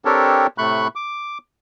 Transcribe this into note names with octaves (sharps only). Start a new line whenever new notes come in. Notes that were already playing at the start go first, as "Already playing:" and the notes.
C4 D4 G4 A4 A#4 C#5
A2 C3 A3 B5 C#6 F#6
D6